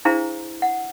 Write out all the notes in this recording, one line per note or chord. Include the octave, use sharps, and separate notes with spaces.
D4 E4 G#4 C5 F5 A#5
F#5